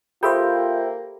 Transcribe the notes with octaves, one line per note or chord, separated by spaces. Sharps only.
A#3 F4 G4 A4 C5 E5 G5 B5